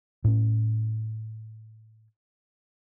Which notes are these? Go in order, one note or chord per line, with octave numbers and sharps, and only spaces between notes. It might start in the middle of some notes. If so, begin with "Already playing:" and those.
A2 C#4